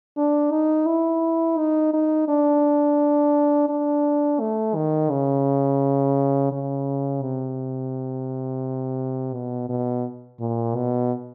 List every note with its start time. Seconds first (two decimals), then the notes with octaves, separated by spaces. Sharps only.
0.17 D4
0.51 D#4
0.87 E4
1.58 D#4
1.93 D#4
2.28 D4
3.69 D4
4.40 A3
4.75 D#3
5.10 C#3
6.52 C#3
7.22 C3
9.34 B2
9.69 B2
10.40 A#2
10.75 B2